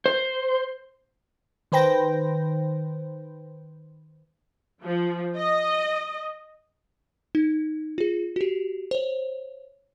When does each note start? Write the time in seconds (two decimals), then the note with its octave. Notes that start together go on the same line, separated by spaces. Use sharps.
0.06 C5
1.72 D#3 B4 C5 G5 A#6
4.82 F3
5.37 D#5
7.35 D#4
7.98 F4 G#4
8.36 F#4 G4
8.91 C5 C#5